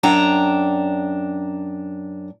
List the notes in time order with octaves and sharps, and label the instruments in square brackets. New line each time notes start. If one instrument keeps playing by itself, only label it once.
[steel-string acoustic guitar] F#2 D4 F#5 G5 A#5